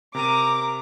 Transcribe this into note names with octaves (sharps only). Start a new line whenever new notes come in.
C3 A#4 A#5 D6 D7 D#7